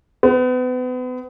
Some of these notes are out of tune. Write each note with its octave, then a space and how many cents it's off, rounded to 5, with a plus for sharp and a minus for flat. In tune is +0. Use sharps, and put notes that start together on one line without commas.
B3 +35